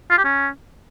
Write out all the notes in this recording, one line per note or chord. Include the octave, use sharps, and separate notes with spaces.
F4
G4
C#4